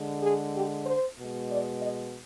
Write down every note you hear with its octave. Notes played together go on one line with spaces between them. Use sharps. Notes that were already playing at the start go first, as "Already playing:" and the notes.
Already playing: D3 G#3
G#4
G4
C5
B2 G#3
D5
D#5